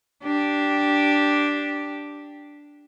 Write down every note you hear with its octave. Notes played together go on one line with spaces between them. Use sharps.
D4 G4